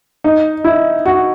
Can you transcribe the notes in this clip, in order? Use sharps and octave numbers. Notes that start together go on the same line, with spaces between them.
D#4
E4
F#4